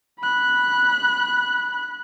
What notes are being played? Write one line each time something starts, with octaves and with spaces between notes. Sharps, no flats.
B5 F#6